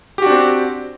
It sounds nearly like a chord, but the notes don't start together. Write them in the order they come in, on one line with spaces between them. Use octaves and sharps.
G4 F#4 D4 C4